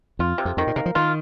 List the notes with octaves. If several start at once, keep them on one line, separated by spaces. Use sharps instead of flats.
F2 F4
C3
F2
F2 D#3
A#2
C3 A#3
F3
D#3 F4